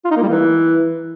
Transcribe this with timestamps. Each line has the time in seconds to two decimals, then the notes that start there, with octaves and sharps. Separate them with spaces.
0.05 F4
0.11 D#4
0.17 A#3
0.23 G3
0.29 E3